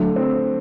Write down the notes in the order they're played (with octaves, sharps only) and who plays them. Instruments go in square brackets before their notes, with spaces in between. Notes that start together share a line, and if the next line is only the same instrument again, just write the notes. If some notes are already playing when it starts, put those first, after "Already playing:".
Already playing: [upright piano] D3 A3 [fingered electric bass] F#3
[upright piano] C4